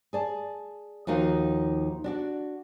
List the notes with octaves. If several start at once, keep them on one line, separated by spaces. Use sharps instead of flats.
G#4 D5 A5
D#2 F3 D#4 F#4 F5
D4 F#4 D5